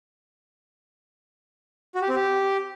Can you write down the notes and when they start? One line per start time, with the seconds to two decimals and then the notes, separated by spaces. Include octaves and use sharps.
1.95 F#4
2.02 G4
2.09 C4
2.15 G4